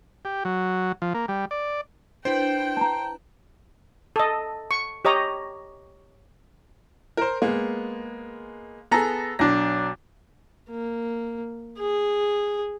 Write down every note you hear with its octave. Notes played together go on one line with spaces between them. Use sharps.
G4
F#3
F3
A#3
G3
D5
D4 E4 B4 C5 G5
A5 A#5
A4 D#5
C#6
G4 C#5 D#5 A#5
A#4 C5
G#3 A#3 B3
B3 G#4 A4 A#5
B1 D4 A#6
A#3
G#4